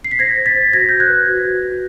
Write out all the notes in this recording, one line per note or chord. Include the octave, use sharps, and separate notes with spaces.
C7
B6
C5 G#6 A#6
C5
A6 B6
C5
F#4 G#6 A#6
F#4 G6
F#6 G#6
B4
F#4
F#4
F#4